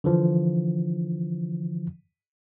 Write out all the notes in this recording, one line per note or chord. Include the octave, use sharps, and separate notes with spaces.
D3 E3 F3